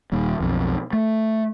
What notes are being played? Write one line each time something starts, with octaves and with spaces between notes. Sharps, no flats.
D#1 D#2 G3
B1 F2
A3